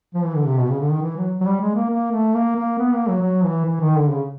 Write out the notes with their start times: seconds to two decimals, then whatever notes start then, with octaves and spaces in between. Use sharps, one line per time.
0.14 F3
0.25 E3
0.36 D3
0.47 C3
0.59 B2
0.70 C#3
0.80 D3
0.91 D#3
1.02 E3
1.17 F#3
1.41 F#3
1.46 G3
1.61 G#3
1.76 A#3
1.90 A#3
2.12 A3
2.35 A#3
2.56 A#3
2.79 B3
2.93 A#3
3.08 F#3
3.22 F#3
3.44 E3
3.66 E3
3.81 D#3
3.96 D3
4.11 C#3